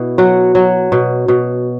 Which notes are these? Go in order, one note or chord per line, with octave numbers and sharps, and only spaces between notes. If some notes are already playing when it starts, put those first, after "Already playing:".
Already playing: B2 E4
F#3 F#4
F#3
B2
B2